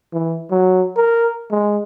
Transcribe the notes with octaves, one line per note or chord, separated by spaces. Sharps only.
E3
F#3
A#4
G#3